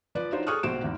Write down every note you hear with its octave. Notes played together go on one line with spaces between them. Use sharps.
F3 B4 D5
D4 D#4 F4 F#4 C5 C#5
G#4 A4 C#6 D#6 F6 F#6
A#1 B2 F#4 C5 D7 E7
E2 G#2